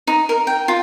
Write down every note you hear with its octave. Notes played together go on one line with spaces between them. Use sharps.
D#4
A#4
G5
F4